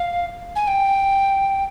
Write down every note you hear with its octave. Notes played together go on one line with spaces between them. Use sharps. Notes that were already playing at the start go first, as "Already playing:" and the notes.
Already playing: F5
G#5
G5